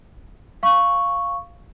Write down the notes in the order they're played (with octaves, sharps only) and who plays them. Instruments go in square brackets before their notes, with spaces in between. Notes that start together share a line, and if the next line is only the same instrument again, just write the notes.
[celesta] F5 C#6